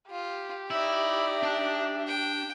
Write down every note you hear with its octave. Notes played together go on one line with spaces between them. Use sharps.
F4 G4
D#4 E4 D5 E5
D4 A5
G5